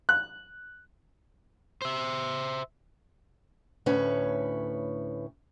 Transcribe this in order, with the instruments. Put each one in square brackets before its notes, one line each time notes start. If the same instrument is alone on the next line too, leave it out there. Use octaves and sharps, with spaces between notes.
[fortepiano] F#6
[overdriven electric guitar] C5 E5
[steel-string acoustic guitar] D2 A2 C#4 B4 C#5